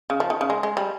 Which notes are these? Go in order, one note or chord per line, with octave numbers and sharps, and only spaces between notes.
C#3
F3
D#3
C#3
G#3
G#3
G3